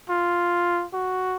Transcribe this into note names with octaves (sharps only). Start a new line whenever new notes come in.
F4
F#4